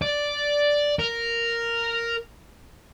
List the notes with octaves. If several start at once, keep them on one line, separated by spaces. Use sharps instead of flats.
D5
A#4